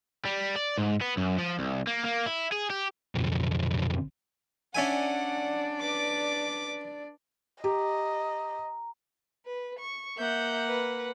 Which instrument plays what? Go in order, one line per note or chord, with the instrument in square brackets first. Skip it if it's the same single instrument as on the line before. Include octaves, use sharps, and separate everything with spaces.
[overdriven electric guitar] G3
D5
G#2
B3
F#2
F3
C2
A#3
A#3
E4
G#4
G4
[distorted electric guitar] B1 F2
[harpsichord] C#4 E5 G#5 [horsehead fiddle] D4 D5 [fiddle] F#5
[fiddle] B4 D6
[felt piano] G4 [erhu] D#5 [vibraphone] A#5
[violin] B4
C#6
[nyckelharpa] A#3 F#5 [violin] E5 G6
[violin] B4